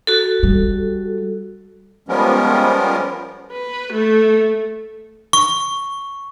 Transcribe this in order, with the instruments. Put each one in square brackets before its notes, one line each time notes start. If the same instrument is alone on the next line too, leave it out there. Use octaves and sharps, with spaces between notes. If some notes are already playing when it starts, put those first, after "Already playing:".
[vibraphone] F#4 A4
[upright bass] G3
[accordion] F3 G3 G#3 B3 C#4 A#4
[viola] B4
A3
[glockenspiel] C#6